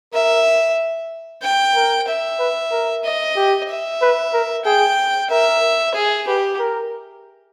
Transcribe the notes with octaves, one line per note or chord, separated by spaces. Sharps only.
A#4 E5
G5
A#4
E5
B4
A#4
D#5
G4
E5
B4
A#4
G#4 G5
A#4 E5
G#4
G4 B4
A#4